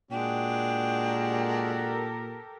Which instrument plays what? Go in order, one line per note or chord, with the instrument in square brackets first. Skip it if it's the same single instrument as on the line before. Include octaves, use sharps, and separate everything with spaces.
[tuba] A#2 [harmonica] G#3 D4 F#4 [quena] G5
[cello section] G4 A4 A#4